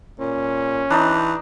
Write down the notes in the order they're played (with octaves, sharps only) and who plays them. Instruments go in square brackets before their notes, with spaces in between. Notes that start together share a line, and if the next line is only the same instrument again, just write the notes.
[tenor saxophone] A#2 [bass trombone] C#4
[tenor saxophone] E3 [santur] D4 D#4